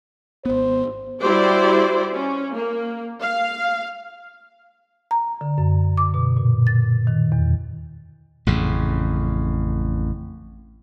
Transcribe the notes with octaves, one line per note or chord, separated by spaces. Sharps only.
G#1 B3 C5
G3 E4 F#4 G4 C5 D5
C#4
A#3
F5
A#5
D3
F#2
D6
B2
A#2
A6
D#3
E2
A1 F2 C#3